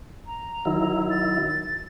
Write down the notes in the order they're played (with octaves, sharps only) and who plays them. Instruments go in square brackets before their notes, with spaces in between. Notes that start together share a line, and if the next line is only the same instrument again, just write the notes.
[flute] A#5
[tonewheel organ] D#3 F#3 E4
[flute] A6